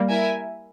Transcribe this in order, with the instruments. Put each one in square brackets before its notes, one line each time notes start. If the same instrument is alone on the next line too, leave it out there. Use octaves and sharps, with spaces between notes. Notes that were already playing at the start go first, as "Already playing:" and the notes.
Already playing: [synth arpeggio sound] G3 A#3
[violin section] E4 A#4 E5 G#5